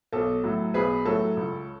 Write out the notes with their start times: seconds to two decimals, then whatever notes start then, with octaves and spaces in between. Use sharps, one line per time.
0.13 B1 A4
0.44 A2 F#3
0.74 B1 G#4 B4
1.05 A2 F#3 A4 C#5
1.37 C#2